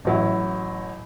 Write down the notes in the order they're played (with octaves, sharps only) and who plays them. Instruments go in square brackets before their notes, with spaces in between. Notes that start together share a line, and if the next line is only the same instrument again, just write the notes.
[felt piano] A1 F#3 E4